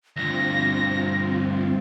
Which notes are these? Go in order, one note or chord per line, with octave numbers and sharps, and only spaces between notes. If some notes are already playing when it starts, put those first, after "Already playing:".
D2 G2 C4 F4 A#6